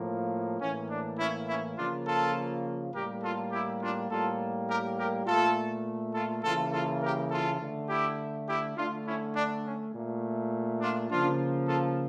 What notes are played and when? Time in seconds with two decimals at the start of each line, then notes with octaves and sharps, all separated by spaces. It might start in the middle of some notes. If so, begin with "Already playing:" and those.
Already playing: A2 F3 A#3
0.61 A2 E3 A#3 C#4
0.90 D4
1.18 C#4 E4
1.48 C#4 E4
1.77 C#3 F3 A#3 D4 F4
2.06 F4 A4
2.94 A2 G3 A#3 G4 A#4
3.23 F4 A4
3.52 E4 G4
3.81 D4 F4
4.10 A2 G3 A#3 F4 A4
4.68 G4 A#4
4.97 G4 A#4
5.26 A#2 A3 F4 A4
6.14 F4 A4
6.43 C#3 E3 A#3 F4 A4
6.72 F4 A4
7.02 G4 A#4
7.31 F4 A4
7.60 D3 A3
7.89 E4 G4
8.48 E4 G4
8.77 D3 A3 D4 F4
9.06 C#4 E4
9.35 D4
9.65 C#4
9.94 A#2 A3
10.80 D4 F4
11.10 C#3 F3 A#3 D4 F4
11.68 F4 A4